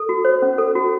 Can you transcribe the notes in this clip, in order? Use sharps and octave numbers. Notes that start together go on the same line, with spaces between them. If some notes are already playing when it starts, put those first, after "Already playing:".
Already playing: A4
F#4
C5
C#4
A4
F#4